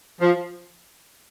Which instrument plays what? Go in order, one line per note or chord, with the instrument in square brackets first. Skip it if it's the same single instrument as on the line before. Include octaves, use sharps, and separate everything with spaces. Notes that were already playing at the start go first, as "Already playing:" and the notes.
[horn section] F3